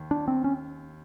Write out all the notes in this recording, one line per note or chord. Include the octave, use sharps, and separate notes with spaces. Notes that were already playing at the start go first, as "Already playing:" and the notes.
Already playing: D#2
D4
C4
C#4